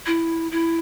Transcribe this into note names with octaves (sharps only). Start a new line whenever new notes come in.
E4
E4